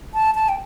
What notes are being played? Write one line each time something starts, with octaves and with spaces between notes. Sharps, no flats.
A5
A5
G5